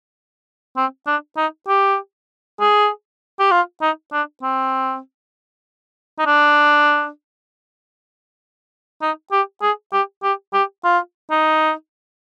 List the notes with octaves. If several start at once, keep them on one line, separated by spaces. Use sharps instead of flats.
C4
D4
D#4
G4
G#4
G4
F4
D#4
D4
C4
D#4
D4
D#4
G4
G#4
G4
G4
G4
F4
D#4